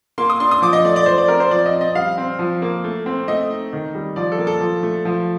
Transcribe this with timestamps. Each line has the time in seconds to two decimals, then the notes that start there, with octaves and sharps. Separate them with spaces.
0.18 A#3 C6
0.30 D#6
0.40 D4 C6
0.51 D#6
0.62 F3 D6
0.73 D#5
0.84 A3 D5
0.96 D5
1.06 F3 C5
1.18 D5
1.28 C4 A#4
1.40 C5
1.51 F3 D5
1.66 D#5
1.73 C4
1.81 D#5
1.95 G3 F5
2.18 C4
2.39 F3
2.62 A#3
2.84 A3
3.06 C4
3.28 A3 D#5
3.50 D#4
3.73 D#3
3.95 G3
4.16 F3 D5
4.32 A4
4.38 A#3
4.47 A4
4.61 F3
4.83 A3
5.05 F3